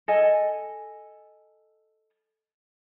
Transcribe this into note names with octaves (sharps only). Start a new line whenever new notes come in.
A4 D#5 G#5